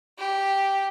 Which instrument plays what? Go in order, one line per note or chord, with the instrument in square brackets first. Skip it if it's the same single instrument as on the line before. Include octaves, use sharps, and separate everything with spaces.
[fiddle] G4